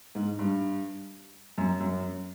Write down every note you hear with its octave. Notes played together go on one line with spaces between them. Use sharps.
G#2
G2
F#2
F#2